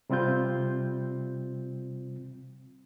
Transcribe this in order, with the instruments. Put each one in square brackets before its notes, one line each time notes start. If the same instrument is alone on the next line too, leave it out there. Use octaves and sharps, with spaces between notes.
[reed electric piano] C3 G3 C4 F4 G6